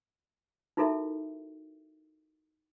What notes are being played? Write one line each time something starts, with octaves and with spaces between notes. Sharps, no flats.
D#4 E4 F#4 A4 A#4 E5